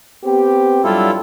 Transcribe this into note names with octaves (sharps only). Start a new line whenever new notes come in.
B3 C4 G4
G2 F#3 G3 E4 F4 A4